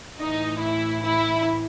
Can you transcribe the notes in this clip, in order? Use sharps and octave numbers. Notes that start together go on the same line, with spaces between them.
A2 E3 D#4
E4
E4